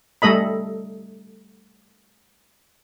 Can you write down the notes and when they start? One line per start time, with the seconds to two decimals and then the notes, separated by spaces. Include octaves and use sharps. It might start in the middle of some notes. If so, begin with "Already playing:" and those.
0.22 G3 A3 A4 D#5 B5